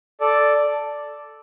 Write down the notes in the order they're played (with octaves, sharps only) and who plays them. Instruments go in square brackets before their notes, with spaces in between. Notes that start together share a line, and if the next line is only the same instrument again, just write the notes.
[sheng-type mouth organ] A4 D5